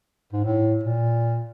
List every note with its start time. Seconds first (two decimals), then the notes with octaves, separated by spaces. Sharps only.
0.33 G#2
0.44 A2
0.83 A#2